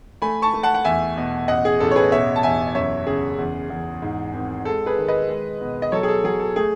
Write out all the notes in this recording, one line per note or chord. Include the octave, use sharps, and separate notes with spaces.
A3 G#5 B5
A5 C#6
A3
F#5 A5
F#5
E2 E5 G#5
B2
A1 D#5 F#5
G#4
A1 A4
C#5
G#4 B4
B2 C#5 E5
A5
E2 E5 G#5
F#2 C#5 E5
C#3 G#4
E2
E2
G#2
G#1
G#3 A4
G#4 B4
D#3
B4 D#5
G#3
B2
D#5
F#3 A4 C#5
G#4
A4
F#3 G#4
A4
A3 G#4